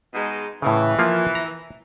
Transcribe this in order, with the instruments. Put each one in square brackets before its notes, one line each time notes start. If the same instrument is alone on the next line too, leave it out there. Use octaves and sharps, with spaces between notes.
[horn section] B2 G#3 D#4
[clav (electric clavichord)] A2 C#3 [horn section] E3
[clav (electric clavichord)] F3 A#3 F4
A#5